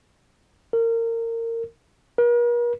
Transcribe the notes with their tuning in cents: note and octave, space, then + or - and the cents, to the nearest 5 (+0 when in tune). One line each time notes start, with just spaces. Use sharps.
A#4 -25
A#4 +45